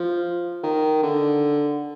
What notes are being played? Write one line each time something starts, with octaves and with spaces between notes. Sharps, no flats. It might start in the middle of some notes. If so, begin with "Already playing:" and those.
Already playing: F3
D#3
D3